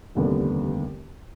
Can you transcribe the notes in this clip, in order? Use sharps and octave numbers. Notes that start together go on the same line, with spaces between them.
F1 D#2 D3 G3 B3